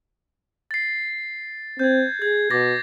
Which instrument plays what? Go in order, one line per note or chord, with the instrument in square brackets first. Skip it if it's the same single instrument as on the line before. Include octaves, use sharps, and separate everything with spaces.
[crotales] A6 C7
[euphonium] C4 [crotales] G6 G#6
[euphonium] G#4 [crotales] G#6
[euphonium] B2 [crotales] D6 A6 A#6